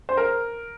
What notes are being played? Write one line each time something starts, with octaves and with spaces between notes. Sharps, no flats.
C5
A#4